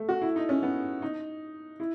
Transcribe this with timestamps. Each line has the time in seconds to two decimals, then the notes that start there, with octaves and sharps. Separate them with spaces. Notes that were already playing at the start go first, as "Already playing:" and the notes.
Already playing: A3
0.09 F#4
0.22 E4
0.36 D#4
0.49 C#4
0.63 B3
1.02 D#4
1.80 E4